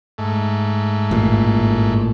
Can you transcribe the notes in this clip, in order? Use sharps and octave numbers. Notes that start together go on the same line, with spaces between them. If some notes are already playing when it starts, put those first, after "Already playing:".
G#2 A3
A1 A#2